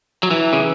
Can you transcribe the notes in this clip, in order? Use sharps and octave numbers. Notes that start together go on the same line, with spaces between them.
F#3
E3
C#3